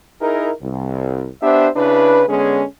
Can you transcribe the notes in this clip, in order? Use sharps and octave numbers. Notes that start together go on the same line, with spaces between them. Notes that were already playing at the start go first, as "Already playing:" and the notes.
D#4 E4 G#4 A#4
C2
B3 D4 G4 C5 E5
C#3 D4 E4 B4
D3 G#3 B3 C#4 G#4 C#5